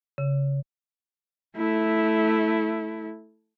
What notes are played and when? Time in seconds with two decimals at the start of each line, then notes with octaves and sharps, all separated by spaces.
0.18 C#3
1.57 A3 E4